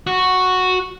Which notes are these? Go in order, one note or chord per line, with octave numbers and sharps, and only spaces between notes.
F#4